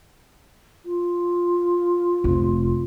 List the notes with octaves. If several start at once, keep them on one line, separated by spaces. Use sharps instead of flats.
F4
F1